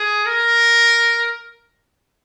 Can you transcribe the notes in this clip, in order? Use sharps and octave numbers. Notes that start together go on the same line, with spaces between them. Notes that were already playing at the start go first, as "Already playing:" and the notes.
Already playing: G#4
A#4